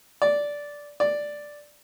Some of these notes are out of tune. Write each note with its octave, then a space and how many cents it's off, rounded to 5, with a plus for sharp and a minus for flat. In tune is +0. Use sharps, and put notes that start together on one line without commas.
D5 -10
D5 +0